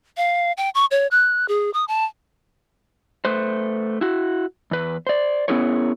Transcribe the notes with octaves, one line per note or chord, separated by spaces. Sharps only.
F5
G5
C#6
C#5
F#6
G#4
D#6
A5
A3 B4 C5
E4 F#4
E2 B4
C5 D5
B3 C#4 E4 G#4 A#4 C#5